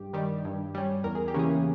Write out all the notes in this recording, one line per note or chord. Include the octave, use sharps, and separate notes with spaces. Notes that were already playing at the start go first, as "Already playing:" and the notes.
Already playing: G2 G4
D#3 G3
G2
G3 C#4
E2 A#4
G#4
G4
C#3 E3 A#3 C#4 G#4